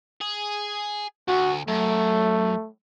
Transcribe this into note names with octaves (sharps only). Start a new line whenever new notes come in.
G#4
D2 F#4
F#2 A3